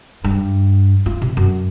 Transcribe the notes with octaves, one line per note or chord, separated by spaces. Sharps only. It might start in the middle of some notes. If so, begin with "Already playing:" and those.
G2
F4
C3
F#2